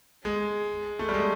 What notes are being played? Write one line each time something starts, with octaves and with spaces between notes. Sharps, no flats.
G#3
A3
G3
G#3